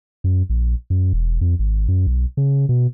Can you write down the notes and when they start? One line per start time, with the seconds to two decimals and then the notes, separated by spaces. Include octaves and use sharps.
0.24 F#2
0.50 A#1
0.90 F#2
1.13 E1
1.41 F2
1.59 G#1
1.88 F#2
2.07 B1
2.37 C#3
2.69 B2